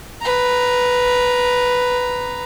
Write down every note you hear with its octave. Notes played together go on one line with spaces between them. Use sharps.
B4 A#5